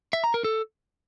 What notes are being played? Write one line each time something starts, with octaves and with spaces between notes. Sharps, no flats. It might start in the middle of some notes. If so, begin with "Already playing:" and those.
E5
A#5
A#4
A4